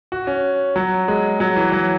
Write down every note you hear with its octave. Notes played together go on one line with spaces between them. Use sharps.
F#4
C#4
F#3
G#3
F#3
E3
F#3